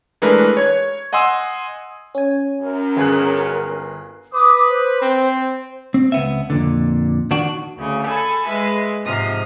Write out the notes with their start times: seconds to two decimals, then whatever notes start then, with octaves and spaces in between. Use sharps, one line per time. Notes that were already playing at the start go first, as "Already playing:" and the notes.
0.22 E3 G#3 A3 D4 A#4 B4
0.57 C#5 G#6
1.13 D#5 F#5 G#5 C6 D#6 E6
2.15 C#4 G#5
2.61 F#2 A#4
2.97 G1 G#4 F#6
4.34 B4 D6 D#6
4.70 C5
5.02 C4
5.94 C4
6.12 C#2 B3 E5
6.50 F2 A#2 D3
7.31 D#3 D4 F#4
7.77 D2 C#3
8.07 A4 G#5 B5
8.47 G#3 B4 E5
9.03 G#2 C3 F3 D#5 D#6 F6